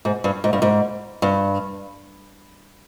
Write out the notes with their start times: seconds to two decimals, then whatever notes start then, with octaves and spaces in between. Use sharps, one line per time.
0.05 G#2
0.24 G2
0.44 G#2
0.53 G2
0.62 G#2
1.22 G2